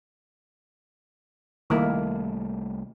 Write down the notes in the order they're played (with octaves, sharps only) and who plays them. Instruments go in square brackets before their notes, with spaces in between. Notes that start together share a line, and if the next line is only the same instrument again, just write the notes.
[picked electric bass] C2 G3 A3 [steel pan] D#3 A#3 E4